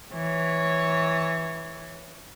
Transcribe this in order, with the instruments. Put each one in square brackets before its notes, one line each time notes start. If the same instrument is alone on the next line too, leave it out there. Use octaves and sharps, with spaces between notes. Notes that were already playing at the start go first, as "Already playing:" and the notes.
[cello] E3 C#5